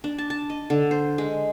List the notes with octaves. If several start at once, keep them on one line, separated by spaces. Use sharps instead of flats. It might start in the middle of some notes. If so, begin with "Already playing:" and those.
D4
A5
A5
D#5
D3
C5
G#3